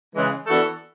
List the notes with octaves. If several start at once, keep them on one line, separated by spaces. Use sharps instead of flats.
C#3 E3 G#3
E3 B3 D4 F#4 A4